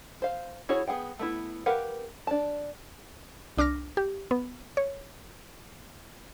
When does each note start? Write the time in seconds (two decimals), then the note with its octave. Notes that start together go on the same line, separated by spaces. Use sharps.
0.22 C5 F5
0.69 E4 F#4 G#4 C#5
0.88 B3 G#4 F#5 G5
1.19 A3 B3 E4
1.66 G4 A#4 B4 F5 F#5
2.27 D4 A5
3.58 C2 D4 D6 F6 A#6
3.97 G4
4.31 B3
4.77 C#5